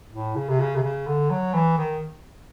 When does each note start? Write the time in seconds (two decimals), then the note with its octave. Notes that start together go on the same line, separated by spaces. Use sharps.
0.12 A2
0.35 C#3
0.49 C3
0.60 C#3
0.76 C3
0.83 C#3
1.07 D3
1.30 F#3
1.54 E3
1.78 D#3